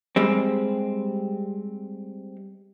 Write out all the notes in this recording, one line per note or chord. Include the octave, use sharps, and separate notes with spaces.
G3 G#3 C4